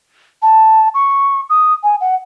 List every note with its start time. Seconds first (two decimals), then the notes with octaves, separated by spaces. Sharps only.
0.42 A5
0.94 C#6
1.50 D#6
1.83 G#5
2.01 F#5